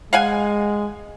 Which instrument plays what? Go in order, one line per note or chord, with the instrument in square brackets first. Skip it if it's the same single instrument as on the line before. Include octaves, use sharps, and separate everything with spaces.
[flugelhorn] G#3 [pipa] F5 F#5 G#5